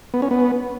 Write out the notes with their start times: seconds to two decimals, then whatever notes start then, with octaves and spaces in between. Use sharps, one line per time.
0.14 B3
0.22 C#4
0.31 B3